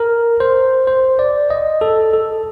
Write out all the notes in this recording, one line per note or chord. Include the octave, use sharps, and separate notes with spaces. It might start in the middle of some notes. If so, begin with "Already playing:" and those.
Already playing: A#4
C5
C5
D5
D#5
A4
A4